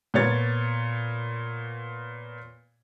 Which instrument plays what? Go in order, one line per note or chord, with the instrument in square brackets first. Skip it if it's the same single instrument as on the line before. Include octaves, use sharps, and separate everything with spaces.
[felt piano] A#2 B3 C#5 A6